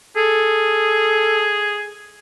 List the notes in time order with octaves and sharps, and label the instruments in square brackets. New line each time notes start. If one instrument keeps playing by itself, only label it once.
[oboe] G#4 [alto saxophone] A4